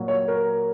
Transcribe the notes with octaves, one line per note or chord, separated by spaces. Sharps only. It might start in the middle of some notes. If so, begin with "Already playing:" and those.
Already playing: A#2 F#3 A#3
C#5
A#4